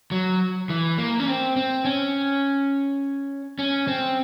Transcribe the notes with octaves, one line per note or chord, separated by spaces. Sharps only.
F#3
E3
A#3
C#4
C4
C4
C#4
C#4
C4